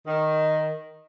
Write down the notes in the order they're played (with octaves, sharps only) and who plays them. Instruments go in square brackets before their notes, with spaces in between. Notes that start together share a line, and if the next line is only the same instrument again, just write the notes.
[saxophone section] D#3